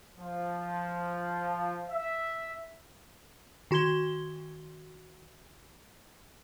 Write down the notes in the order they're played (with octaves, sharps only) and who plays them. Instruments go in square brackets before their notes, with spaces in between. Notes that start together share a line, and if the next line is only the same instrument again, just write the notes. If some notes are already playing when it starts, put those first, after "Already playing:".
[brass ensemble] F3
E5
[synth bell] D#3 F#4 C6 G#6 G7